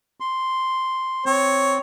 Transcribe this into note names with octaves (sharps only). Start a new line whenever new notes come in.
C6
C4 C#5